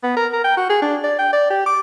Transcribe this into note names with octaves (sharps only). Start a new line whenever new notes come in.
B3
A#4
A#4
G5
F#4
G#4
D4
D5
G5
D5
G4
D6